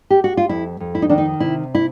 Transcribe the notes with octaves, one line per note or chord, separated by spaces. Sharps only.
G4
F#4
F4
F2 E4
F2
E4
D#4
D#3 D4
D#4
C3 E4
E4